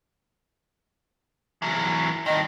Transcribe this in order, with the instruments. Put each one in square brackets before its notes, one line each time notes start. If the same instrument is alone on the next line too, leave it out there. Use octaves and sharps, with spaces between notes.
[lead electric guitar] E3 F#3
[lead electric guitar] G2 D#3 [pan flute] D#5